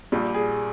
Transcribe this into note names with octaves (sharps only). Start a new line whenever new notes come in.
A#1 A#2 G3
G#4